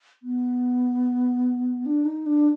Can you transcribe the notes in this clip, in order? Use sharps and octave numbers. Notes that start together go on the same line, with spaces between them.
B3
D4
D#4
D4